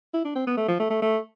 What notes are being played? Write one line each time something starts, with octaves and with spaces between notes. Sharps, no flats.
E4
D4
C4
B3
A3
F3
A3
A3
A3